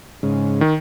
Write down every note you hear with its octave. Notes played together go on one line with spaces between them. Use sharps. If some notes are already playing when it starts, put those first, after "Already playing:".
G#2 C#3
D#3